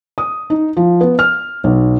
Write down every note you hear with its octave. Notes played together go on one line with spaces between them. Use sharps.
D#6
D#4
F3
B3
F6
B1